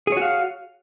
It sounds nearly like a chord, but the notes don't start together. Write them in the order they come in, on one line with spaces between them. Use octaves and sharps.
G#4 C#5 F#4 F5